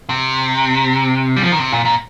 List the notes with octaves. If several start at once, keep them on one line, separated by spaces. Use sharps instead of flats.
C3
G3
F3
D#3
C3
A#2
A#2